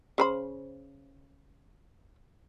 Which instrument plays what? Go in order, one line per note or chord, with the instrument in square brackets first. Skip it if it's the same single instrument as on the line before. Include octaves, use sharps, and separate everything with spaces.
[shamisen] C#3 C5 B5